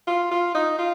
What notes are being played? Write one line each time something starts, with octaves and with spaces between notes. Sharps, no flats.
F4
F4
D#4
F4